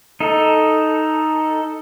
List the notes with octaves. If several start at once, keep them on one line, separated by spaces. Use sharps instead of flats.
D#4 A4